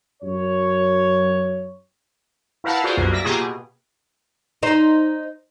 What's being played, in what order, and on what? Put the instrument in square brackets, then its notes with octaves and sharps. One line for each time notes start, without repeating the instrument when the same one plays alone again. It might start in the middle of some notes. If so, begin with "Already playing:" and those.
[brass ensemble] F#2 C#5
[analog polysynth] E4 A#4 B4 F5 F#5 A5
F4 F#4 G#4 C5 D5
C2 F#2 B2 A#3
D5 E5 A#6
B2 A#3 F4 G4 G#4
B2
[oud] D#4 C5